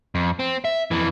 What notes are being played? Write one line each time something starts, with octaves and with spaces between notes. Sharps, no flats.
F2
C4
E5
F2 E3